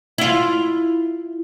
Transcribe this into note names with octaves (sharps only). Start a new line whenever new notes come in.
E4 F4